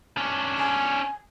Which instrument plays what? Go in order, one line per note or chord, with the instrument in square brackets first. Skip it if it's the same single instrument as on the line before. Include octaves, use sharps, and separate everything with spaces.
[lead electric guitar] C#4 D4
[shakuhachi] G#5